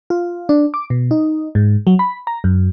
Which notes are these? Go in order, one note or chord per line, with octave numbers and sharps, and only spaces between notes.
F4
D4
D6
B2
D#4
G#2
F#3
B5
A#5
F#2